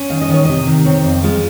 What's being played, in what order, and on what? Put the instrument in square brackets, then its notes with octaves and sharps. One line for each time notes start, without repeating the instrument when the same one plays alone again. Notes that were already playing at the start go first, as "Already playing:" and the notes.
Already playing: [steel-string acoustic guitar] C#4
D#3 F5
D#5
D#3
C#5
C3 D#5
D#3
C4 C#5
F2
G#3 F4